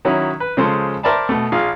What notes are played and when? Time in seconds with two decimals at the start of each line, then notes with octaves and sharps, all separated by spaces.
0.05 D#3 F#3 C#4 E4
0.40 B4
0.57 C#3 F3 G#3 A4 C5
1.03 A#4 C5 D5 E5 A5 B5
1.29 B2 A3
1.52 A#1 F4 G#4 F5